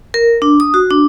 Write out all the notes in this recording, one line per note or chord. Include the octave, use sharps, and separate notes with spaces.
A#4
D4
D#6
F#4
D4